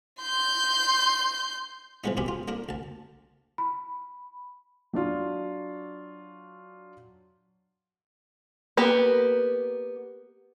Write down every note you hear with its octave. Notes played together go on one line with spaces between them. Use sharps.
C6 G6
E3 F3 G#3 B3 D#4
F#2 B2 G4 G#4 A#4 B5
F4
A#3 D4 A#4
D2 A5
B5
F#3 D4 F4
A#3 B3 G4